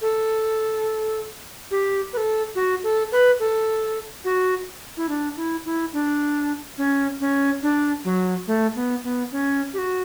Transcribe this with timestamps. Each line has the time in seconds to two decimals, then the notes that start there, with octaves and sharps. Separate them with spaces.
0.02 A4
1.71 G4
2.13 B4
2.17 A4
2.55 F#4
2.84 A4
3.12 B4
3.40 A4
4.25 F#4
4.97 E4
5.09 D4
5.37 E4
5.65 E4
5.93 D4
6.78 C#4
7.20 C#4
7.63 D4
8.04 F#3
8.47 A3
8.75 B3
9.04 B3
9.32 C#4
9.74 G4
9.78 F#4